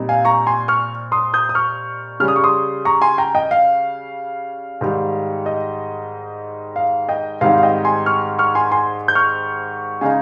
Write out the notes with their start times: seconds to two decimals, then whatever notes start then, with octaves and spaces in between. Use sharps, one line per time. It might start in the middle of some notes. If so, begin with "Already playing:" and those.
Already playing: A#2 G3 C4 D#4
0.09 F5 G#5
0.25 A#5 C#6
0.47 G#5 C6
0.68 C#6 F6
1.12 C6 D#6
1.34 D#6 G6
1.49 D#6
1.55 C#6 F6
2.20 C#3 G3 C#4 F6
2.28 D#6
2.36 C#6
2.44 C6 D#6
2.85 A#5 C#6
3.02 G#5 C6
3.18 G5 A#5
3.35 D#5 G5
3.51 F5
4.81 G#2 D#3 G3
5.46 D#5
6.76 F5
7.09 D#5 G5
7.41 G#2 D#3 G3 C4 D#4 F5
7.58 F5
7.63 D#5 G5
7.85 G#5 C6
8.06 C#6 F6
8.39 C#6 F6
8.55 G#5 C6
8.72 G#5 C6
9.08 G6
9.15 C#6 F6
10.01 C#3 G#3 D#4 F5 G#5